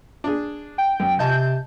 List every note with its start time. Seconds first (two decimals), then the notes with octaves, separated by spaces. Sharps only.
0.24 D4 G#4
0.78 G5
1.00 F#2
1.19 C3 D#5 G#5 A5 G6